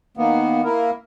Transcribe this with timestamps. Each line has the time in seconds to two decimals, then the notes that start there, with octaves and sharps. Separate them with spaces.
0.17 D#3 A#3 B3
0.64 A#3 E4 A#4